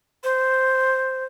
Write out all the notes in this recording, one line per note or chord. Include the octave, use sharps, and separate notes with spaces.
C5